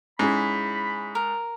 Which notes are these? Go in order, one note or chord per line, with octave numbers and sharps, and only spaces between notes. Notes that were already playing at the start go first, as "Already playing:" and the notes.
G#2 C#4 E4 G#4 B5
A#4